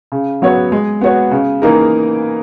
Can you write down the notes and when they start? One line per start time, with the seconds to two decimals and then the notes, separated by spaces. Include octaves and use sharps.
0.12 C#3
0.42 F#3 B3 F#4 C#5
0.72 G#3
1.01 B3 F#4 C#5
1.31 C#3
1.62 E3 A#3 D#4 A#4